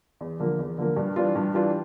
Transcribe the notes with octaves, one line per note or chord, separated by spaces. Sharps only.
E2
D3 F3 A#3
E2
D3 F3 A#3
G2
E3 G3 D4 F4
G2
E3 G3 D4 F4